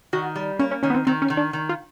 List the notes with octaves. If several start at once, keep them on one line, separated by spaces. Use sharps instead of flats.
D#3 F#4
G3
A#3 C#4
C#4
D#3 C#4
B3
C4
D#3 C4
C#4
D#3
D4
D#3
F4